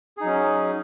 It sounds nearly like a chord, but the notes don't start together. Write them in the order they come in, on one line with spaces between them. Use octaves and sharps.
G#4 D#4 F#3 C#4